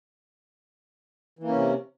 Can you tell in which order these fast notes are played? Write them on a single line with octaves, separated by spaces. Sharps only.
E3 A#3 C#4 C3